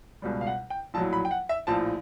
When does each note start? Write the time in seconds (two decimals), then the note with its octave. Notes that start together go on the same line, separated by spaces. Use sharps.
0.22 C#2 B2 G3
0.41 F5
0.47 F#5
0.70 G5
0.94 A#1 A2 F#3 A5
1.13 B5
1.25 G5
1.31 F#5
1.49 E5
1.67 A#1 A2 F3 A5